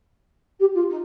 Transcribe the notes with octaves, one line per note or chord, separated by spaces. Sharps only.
G4
F4
D#4